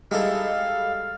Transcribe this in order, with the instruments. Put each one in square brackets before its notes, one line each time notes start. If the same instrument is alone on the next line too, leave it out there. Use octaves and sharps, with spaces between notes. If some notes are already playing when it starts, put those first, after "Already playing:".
[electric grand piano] G3 A4 [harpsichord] G#3 D#4 E4 [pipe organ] F5